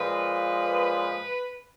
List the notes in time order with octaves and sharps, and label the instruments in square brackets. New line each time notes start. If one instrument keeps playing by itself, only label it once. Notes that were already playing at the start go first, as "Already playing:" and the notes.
Already playing: [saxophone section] A#2 F3 G#3 B4